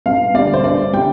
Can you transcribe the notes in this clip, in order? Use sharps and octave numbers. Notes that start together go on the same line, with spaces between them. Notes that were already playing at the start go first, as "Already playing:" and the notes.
G2 F5
D3 G3 D5
C5
G2 D5
D3 G3 G5